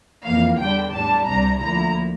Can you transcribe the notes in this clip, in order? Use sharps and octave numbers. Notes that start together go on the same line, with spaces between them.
F2 E3 A#3 F5
E2 D3 G3 D4 G5
A2 G3 D4 A5
C2 C3 G3 D4 A#5
D2 D3 F3 A#3 E4 A#5